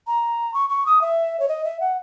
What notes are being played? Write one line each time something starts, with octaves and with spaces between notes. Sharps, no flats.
A#5
C#6
C#6
D#6
E5
C#5
D#5
E5
F#5